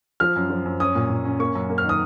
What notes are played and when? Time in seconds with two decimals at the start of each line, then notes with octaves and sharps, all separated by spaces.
0.20 F3 F6
0.36 F#2
0.50 F3
0.66 F#2
0.80 C#4 D#6
0.95 A#2
1.10 A#2
1.25 C#4
1.40 A#3 C#6
1.55 F#2
1.70 A#3
1.78 F6
1.84 D#3 D#6